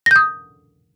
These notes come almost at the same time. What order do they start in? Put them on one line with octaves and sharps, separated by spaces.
A#6 G6 D#6